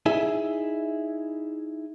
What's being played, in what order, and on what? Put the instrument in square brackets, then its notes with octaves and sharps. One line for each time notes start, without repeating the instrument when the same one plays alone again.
[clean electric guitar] D#4 E4 G#4 E5